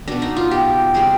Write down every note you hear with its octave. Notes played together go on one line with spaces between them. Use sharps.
B2 B3 D4
D#4
F4
G4
C3 G3 B3 G#4